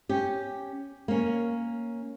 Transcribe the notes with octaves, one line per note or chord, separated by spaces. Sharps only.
C#4 G4
A#3 C#4